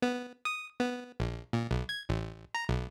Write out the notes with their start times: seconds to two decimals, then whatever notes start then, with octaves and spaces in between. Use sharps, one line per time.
0.02 B3
0.45 D#6
0.80 B3
1.20 A#1
1.53 A#2
1.71 B1
1.89 G#6
2.09 A1
2.55 A#5
2.69 B1